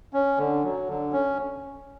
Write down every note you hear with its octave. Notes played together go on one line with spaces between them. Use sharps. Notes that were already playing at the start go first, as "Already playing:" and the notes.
C#4
D3
F#3
D3
C#4